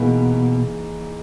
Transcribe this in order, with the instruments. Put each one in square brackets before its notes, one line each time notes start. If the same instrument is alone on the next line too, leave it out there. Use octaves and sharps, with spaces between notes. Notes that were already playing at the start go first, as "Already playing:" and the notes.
Already playing: [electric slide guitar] B2 [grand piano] E3 A#3 D#4 G#4